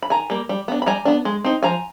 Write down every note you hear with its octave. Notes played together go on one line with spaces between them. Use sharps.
B5
D#3 G#5 A#5
G3 A#3
G3
B3 D4
B5
G3 G#5 A#5
B3 D4
G#3
C4 D#4
F3 G#5 A#5